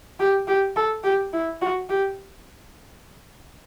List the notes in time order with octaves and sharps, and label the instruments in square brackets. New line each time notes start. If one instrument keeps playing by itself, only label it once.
[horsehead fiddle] G4
G4
A4
G4
E4
F#4
G4